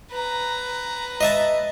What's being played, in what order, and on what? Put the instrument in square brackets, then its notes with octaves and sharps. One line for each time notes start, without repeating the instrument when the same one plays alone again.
[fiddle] B4 A#5
[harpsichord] D#5 E5 A5